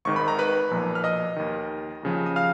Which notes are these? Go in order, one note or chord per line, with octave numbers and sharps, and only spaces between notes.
G#1 G#2 D#3 C#6
B5
A#5
B4 B5
B1 A#2 F3
F6
D#5 D#6
D#2 D#3
D#2 C#3 F3
D#6
F5 F6